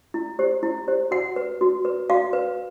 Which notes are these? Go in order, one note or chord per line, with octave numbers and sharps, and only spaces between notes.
E4
G4 C5
E4
G4 C5
F#4 F#5
B4
F#4
B4
F#4 F5
B4